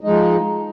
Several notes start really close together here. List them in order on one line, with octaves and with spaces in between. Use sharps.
D#4 G#3 F3